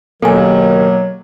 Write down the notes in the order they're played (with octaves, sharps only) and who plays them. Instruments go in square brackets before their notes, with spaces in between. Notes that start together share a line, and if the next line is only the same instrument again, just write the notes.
[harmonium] D#2 D#3 [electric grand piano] B2 A#3 [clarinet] F#3 [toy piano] A4 G#5